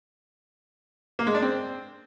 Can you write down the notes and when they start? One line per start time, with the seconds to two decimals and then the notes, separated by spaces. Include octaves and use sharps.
1.19 A#3
1.27 G#3
1.35 D4
1.42 C4